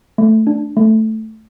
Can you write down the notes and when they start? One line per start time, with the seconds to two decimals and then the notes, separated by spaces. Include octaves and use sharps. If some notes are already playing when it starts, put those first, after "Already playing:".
0.18 A3
0.47 D4
0.77 A3